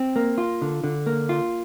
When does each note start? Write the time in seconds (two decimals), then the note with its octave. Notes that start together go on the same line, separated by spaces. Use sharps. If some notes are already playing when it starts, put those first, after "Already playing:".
Already playing: C4
0.16 A#3
0.38 F4
0.62 D3
0.84 D3
1.06 A#3
1.29 F4